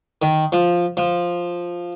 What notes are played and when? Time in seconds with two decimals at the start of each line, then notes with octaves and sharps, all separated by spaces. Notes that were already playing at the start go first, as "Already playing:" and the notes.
0.22 D#3
0.52 F3
0.97 F3